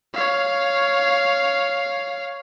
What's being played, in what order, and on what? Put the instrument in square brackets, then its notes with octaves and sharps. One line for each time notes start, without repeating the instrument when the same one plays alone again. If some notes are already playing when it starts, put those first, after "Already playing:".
[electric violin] C#5 F5